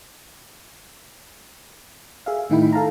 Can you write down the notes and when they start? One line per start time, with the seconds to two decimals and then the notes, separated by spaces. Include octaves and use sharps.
2.26 G#4 E5 F5
2.50 A2 D#3 D#4 E4 G5 B5
2.73 A4 F5 A5 A#5